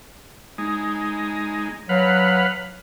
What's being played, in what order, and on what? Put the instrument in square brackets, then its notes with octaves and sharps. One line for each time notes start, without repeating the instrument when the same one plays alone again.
[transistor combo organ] G#3 D#4
[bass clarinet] F#3 [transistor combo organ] B4 F5 F#5